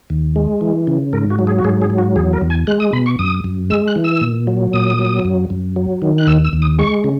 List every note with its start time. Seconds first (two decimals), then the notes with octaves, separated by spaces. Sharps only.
0.10 D#2
0.36 G#3
0.61 E3
0.87 C#3
1.13 G#2 A#4
1.30 F#4
1.39 F#3
1.47 G#4
1.58 F#4
1.65 G#2 G#4
1.82 G#4
1.90 F#3
1.98 F#4
2.16 E2 G#4
2.33 A#4
2.41 E2
2.50 G#5
2.67 G#3 F#6
2.80 D#6
2.93 B2 B5
3.06 C#6
3.19 F#2 D#6
3.44 F#2
3.70 G#3 E6
3.88 F#6
3.96 E3
4.04 E6
4.21 A#2
4.47 F#3
4.73 A#2 D#6
4.99 F#3
5.25 F#2
5.50 F#2
5.76 F#3
6.02 D#3
6.18 F#6
6.27 D#2 E6
6.44 E6
6.53 D#2
6.62 D#6
6.79 G#3 C#6
7.04 C#3